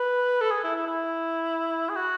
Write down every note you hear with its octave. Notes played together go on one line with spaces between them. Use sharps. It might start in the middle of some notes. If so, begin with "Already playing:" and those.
Already playing: B4
A4
G#4
E4
E4
E4
G#4
F#4